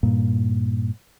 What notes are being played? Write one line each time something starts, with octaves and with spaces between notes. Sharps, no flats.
G2 A#2